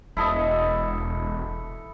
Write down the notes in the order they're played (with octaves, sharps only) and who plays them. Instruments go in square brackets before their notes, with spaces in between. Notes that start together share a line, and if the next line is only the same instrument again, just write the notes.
[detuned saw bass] E1 [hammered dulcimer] E4 A4 D#5